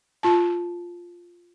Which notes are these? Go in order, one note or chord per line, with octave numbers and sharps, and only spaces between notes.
F4 A5